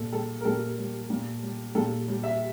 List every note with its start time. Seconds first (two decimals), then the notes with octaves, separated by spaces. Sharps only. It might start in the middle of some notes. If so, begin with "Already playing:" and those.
Already playing: A#2 A4
0.13 G3 A4
0.41 A#4
0.45 A#2 A4
0.78 G3
1.10 A#2
1.43 G3
1.75 A#2 A4
2.08 G3
2.23 E5